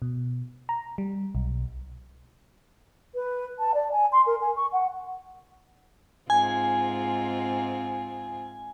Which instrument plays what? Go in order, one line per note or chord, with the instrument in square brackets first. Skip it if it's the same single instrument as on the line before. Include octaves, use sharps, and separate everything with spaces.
[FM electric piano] B2
A#5
G3
B1
[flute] B4
A5
D5
G#5
C6
A#4
G#5
C#6
F#5
[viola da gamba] G#2 C4 F4 [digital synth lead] G#5